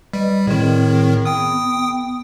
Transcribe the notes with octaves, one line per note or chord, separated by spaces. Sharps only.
G3 B4 D5 D#5
A2 D#3 C4 G#4
B3 G5 D#6